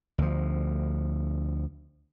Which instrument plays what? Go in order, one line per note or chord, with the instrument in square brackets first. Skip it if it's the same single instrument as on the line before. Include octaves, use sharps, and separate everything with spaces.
[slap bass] D2 F3